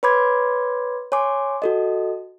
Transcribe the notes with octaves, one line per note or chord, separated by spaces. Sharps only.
B4 C#5 B5 C6 D6 G#6
C#5 G#5 C6 D6
F#4 A4 D#5